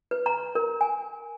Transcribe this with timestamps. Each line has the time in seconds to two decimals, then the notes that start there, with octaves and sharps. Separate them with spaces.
0.11 B4
0.26 A#5
0.55 A#4
0.81 G#5